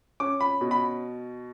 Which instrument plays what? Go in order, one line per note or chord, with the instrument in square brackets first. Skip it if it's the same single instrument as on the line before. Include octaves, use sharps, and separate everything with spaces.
[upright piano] C#4 D6
B5
B2
B5